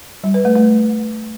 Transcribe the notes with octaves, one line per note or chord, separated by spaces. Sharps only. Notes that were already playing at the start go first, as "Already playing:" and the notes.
G3
B4
A3
A3